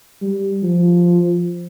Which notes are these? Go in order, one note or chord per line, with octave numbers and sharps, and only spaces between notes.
G3
F3